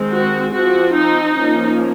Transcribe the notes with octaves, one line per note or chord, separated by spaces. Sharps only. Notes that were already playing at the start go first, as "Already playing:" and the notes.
Already playing: D#3 G#3 C4
F#4
F3 C4 F#4
D#4
F3 A#3 C#4